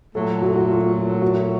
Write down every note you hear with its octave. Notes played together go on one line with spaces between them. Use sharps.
A#2 F#3 A3 A4
F#4
A4
F#4
F4
F4
F#4